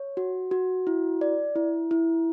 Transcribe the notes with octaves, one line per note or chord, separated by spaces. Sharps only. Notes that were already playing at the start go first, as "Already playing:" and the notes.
Already playing: C#5
F#4
F#4
E4
D5
E4
E4